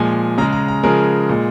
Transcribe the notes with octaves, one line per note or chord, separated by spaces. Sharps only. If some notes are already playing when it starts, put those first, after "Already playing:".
Already playing: A#2 F3 G#3 G#5
C#3 G#3 A#5
A#5
A#5
C#3 F3 G#3 A#4
A#2 G#3